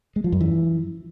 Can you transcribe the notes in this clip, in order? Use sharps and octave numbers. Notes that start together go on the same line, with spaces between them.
G#3
F3
F#2
E3